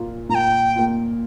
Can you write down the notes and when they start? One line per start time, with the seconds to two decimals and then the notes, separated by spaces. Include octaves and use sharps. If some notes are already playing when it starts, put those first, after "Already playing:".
Already playing: A#2 A#3 F4
0.29 A#2 A#5
0.35 G5
0.76 A#3 F4